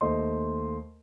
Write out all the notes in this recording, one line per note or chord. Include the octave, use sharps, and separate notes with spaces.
D#2 A3 C5 D#5 C6